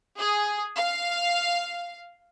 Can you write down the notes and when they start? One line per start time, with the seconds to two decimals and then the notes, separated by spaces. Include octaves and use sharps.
0.18 G#4
0.74 F5